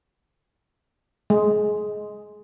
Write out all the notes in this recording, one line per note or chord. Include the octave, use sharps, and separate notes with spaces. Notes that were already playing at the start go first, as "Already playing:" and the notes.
G#3